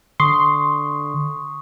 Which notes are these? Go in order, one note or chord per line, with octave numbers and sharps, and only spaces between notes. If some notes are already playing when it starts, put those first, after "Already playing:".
D3 C6 C#6 D#6